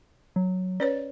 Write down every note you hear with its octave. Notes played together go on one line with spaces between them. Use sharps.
F#3
C#4 B4 C#5 D5